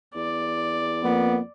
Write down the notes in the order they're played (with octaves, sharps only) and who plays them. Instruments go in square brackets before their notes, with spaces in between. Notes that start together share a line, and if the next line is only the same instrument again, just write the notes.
[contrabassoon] E2 [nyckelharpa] D5
[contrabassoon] F2 [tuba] A#3 [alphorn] B3